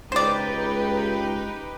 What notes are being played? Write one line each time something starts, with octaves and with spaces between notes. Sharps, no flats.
C#2 D#4 G4 B4 C5 D5